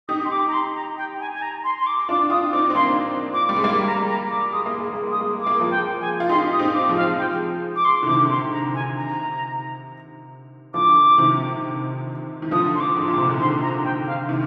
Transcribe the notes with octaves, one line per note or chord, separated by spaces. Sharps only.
D#4 G4 D#6
C6
D6
A#5
C6
A#5
G5
G#5
G#5
A#5
C6
C6
D6
D4 F4 D6
D4 F4 D#6
C4 D#4 D6
C4
A#3 D4 C6
D6
G3
G#3
G3 A#3 D6
A#5
A#5
D6
G#3 D#6
A#3
G#3
A#3
G#3
D#6
A#3
G#3
D6
A#3
F3 G#3
G5
G#5
F4
D#4 G4 C6
D#6
C4 D#4
D6
F3 G#3
F5
G5
D6
C6
D3
C3 D#3 D6
C6
A#5
G#5
A#5
D3 F3 D6
C3 D#3
D#3
D3 F3 D#6
C6
D6
G#2
A#2 D6
C3
D3
C3 D#3 C6
A#5
G5
F5
C3 D#3